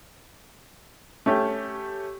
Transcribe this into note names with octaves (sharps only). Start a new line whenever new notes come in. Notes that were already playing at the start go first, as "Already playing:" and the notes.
A3 C#4 G4